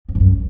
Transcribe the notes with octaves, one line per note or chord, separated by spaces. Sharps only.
F2
G#2
F#2